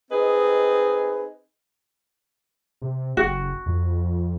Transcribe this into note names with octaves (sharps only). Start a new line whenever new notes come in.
C4 D#4 G#4 B4 D#5
C3
F#1 F#4
F2